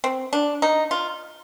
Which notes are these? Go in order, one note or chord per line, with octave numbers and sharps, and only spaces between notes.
C4
D4
D#4
F4